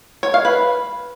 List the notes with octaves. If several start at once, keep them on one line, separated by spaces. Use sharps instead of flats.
C#5
F5
B4